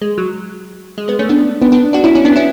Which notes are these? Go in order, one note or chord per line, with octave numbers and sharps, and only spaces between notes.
G#3
F#3
G#3
G#3 B3
A3 C#4
B3 D4
B3 D4
B3 D4
D4 F#4
C#4 E4
C#4 E4
B3 D4
C#4 E4